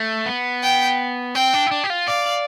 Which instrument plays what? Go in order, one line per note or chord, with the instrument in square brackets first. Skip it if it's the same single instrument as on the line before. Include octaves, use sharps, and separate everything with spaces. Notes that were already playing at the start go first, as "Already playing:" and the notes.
Already playing: [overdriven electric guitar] A3
B3
[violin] G5
[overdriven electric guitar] C4 [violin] G5
[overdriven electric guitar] D4
E4
D4
G4
F4
[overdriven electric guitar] D5 [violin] F5